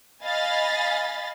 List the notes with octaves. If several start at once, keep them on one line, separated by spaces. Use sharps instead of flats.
D#5 F5 G#5 B5 A6